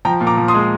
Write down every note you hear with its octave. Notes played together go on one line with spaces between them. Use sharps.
F3 G5 A#5
A#2
A#5 D6
F3
C6 D#6
G#3